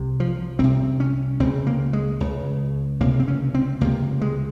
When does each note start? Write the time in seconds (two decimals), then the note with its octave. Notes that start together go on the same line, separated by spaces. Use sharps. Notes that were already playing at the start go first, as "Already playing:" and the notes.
Already playing: C2 C3
0.20 F3
0.59 C2 C3 C4
1.00 C#4
1.40 C#2 C#3 C4
1.67 A#3
1.93 G#3
2.20 C#2 C#3
3.01 C#2 C3 A#3
3.19 C4
3.28 C#4
3.55 C4
3.81 C#2 C3 A#3
4.21 G#3